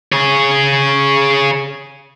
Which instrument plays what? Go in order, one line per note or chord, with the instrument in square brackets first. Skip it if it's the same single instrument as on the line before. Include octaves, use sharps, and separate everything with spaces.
[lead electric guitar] G#4 C#5